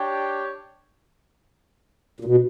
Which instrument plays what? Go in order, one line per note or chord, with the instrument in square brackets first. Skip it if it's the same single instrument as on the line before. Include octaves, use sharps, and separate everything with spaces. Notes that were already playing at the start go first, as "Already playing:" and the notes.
Already playing: [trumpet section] D4 G4 C#5 G5
[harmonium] A#2
B2